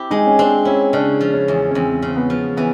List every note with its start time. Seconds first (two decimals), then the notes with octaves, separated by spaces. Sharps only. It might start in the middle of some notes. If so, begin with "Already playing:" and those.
Already playing: C4 E4 G4
0.11 G#3 D#4
0.27 C#4
0.39 C4 D4
0.65 C#4 E4
0.93 C#3 D4
1.21 F3
1.34 C#4
1.48 E2
1.71 C#4
1.75 E2 C4
2.02 C#3
2.07 C4
2.16 B3
2.30 F3
2.57 E3 B3